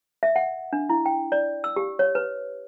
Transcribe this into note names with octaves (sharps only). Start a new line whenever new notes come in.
E5
F#5
D4
E4
G5
D5
E6
G4
C#5
B4